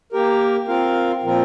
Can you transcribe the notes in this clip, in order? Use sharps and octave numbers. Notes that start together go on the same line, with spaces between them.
A#3 G4 A#4
C4 F4 A#4 F5
A#2 F3 C4 F4 A#4